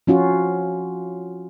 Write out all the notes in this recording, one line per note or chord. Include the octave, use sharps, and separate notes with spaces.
F3 C#4 F4 F#4